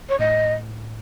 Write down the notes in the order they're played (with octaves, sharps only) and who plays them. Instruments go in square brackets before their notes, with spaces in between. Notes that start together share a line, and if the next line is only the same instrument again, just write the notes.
[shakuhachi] C#5
[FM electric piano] A2 [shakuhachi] D#5